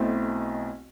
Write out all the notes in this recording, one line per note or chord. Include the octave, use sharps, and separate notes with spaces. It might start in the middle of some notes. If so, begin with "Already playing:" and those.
Already playing: B1 B2 A3 C4 E4